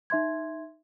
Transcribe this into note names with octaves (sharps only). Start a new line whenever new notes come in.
D#4 E5 C6 G#6